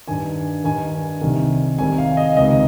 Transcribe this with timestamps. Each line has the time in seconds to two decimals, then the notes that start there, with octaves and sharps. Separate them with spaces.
0.08 G2 D#3 G#5
0.64 G2 D#3 G#5
1.21 C2 C3 D#3
1.78 C2 C3 D#3 G#5
1.98 F5
2.17 D#5
2.37 C#2 C3 D#3 D#5